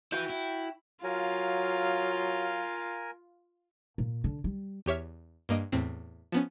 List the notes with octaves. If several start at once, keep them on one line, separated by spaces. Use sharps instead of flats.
E4 F#4 B4 G5
E4
F#3 F4 A#4 F5 G#5
A#2
D3
G3
E2 G4 C#5 E5 F6
G2 A#3 D#5 D7
E2 A2 C4
F3 B3 C#4